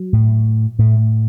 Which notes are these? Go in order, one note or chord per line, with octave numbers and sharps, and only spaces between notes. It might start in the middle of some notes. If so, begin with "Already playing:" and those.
Already playing: F#3
A2
A2 A3